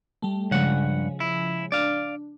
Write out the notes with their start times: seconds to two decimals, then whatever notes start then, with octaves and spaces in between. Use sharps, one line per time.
0.22 G3 A3
0.51 G2 C#3 F3 G#3 F#5
1.20 E4
1.72 D4 D5 F5